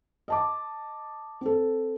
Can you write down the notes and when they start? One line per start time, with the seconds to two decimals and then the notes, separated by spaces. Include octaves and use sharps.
0.28 D#5 A5 D6
1.41 C4 A4